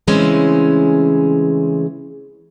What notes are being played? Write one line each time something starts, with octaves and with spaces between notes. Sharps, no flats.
C#3 E3 G#3 A3 C4 C#4